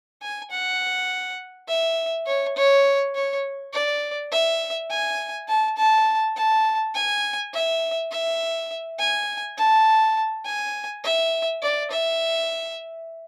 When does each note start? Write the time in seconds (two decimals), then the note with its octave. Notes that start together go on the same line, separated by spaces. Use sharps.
0.22 G#5
0.51 F#5
1.68 E5
2.26 C#5
2.57 C#5
3.15 C#5
3.73 D5
4.32 E5
4.91 G#5
5.48 A5
5.78 A5
6.36 A5
6.95 G#5
7.53 E5
8.12 E5
8.99 G#5
9.58 A5
10.45 G#5
11.04 E5
11.62 D5
11.91 E5